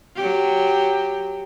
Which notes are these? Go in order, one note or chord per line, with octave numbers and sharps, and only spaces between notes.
F#3 G4